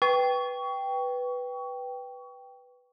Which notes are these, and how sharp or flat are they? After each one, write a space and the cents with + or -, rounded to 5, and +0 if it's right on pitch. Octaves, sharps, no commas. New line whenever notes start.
B4 +0 G5 +0 C#6 +25